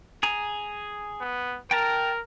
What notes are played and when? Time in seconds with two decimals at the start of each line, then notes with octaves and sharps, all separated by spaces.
0.23 G#4 G#5 A#5
1.21 B3
1.71 A#4 G5 A5 A#5